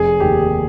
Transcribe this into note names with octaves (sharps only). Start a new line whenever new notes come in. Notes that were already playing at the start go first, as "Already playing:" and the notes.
Already playing: F1 G#4
D#2 D#3 G4